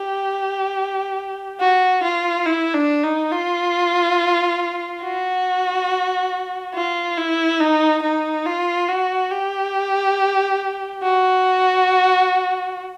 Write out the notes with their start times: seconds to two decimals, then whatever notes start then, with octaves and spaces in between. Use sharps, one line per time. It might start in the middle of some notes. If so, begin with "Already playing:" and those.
Already playing: G4
1.60 F#4
2.03 F4
2.46 E4
2.74 D4
3.03 D#4
3.31 F4
5.03 F#4
6.75 F4
7.17 E4
7.60 D#4
8.02 D#4
8.46 F4
8.89 F#4
9.31 G4
11.03 F#4